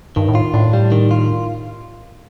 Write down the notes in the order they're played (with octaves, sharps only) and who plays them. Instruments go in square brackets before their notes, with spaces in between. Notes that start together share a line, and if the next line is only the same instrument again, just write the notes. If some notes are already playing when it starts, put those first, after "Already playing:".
[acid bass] G2 [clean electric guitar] D#3
[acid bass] A2
[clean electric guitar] F4
[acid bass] A2 [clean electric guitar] D4
[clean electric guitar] G3
D#3
F4